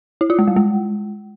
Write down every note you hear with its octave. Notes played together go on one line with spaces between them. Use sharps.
E4
F4
G#3
G3
G#3